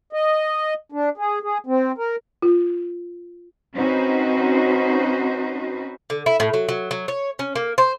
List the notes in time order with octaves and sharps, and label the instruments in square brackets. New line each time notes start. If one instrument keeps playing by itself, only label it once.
[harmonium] D#5
D4
G#4
G#4
C4
A#4
[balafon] F4
[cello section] C4 C#4 D#4 F#4 B4 C5
[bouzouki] D3
E4
A2
F#3
F#3
F#3
C#5
C#4
A#3
C5